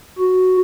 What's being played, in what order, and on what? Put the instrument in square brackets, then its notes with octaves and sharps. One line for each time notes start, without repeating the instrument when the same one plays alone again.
[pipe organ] F#4